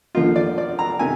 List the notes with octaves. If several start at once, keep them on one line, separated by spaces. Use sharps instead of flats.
D3 F3 A#3 D#4 F4
D5
D5
A#5
C3 D#3 G#5